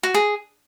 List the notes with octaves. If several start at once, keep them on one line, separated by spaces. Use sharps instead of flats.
F#4
G#4